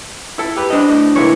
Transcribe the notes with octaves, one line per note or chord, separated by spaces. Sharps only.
E4 A4
G4 B4
D4 C5 D#5
A2
C2 E3 G#3 A#3 E4 C#5